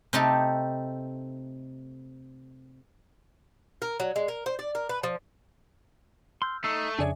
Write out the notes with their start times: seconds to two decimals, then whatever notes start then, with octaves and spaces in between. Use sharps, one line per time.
0.13 C3 A3 C4 D#4 G4 A4
3.82 A#4
4.00 F#3
4.16 G#3
4.28 A#4
4.46 C5
4.59 D5
4.75 A#4
4.89 B4
5.03 F3
6.42 C6 E6 F6 G6
6.64 A3 D#4 E6 C7
6.99 F2 C#3 D4 G#4 C#5 D5 E5 G#5